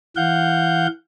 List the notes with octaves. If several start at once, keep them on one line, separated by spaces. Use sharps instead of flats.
E3 F5 F#5 G6